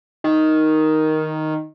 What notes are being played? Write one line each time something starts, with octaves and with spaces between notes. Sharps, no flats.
D#3